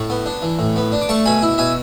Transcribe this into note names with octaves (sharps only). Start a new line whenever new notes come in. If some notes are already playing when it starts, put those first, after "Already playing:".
Already playing: A2 A5 C#6
B3
D4
E3
A2
B3
D4
D6
A3 A5 C#6
B2 G#5 B5
E4
B2 E5 G#5